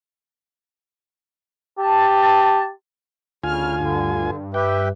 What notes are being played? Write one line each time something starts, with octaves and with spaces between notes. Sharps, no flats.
G4 A5
D2 C#3 F4 G#5 F6
G2 D3
G4 B4 E5 G5